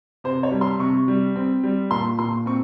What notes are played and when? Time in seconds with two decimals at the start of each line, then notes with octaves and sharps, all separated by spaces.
0.24 C3 C5
0.43 C#5
0.52 G3
0.61 C6
0.79 C3 C#6
1.08 G3
1.36 C4
1.64 G3
1.91 A#2 C6
2.19 A#2 C6
2.46 C4 C#6